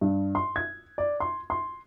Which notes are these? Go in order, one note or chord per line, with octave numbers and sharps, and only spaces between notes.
G2
C6
G#6
D5
C6
C6